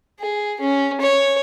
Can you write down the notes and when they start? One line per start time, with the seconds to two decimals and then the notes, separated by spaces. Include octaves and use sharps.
0.20 G#4
0.61 C#4
1.01 C#5